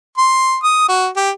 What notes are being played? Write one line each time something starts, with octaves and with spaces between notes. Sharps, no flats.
C6
D#6
F#4
G4